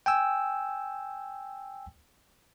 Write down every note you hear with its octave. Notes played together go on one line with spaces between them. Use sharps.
G5 G#5 E6